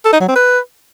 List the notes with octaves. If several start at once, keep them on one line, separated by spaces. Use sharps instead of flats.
A4
D#4
F#3
C4
B4